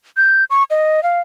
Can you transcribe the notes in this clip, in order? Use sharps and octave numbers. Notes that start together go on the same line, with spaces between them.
G6
C#6
D#5
F5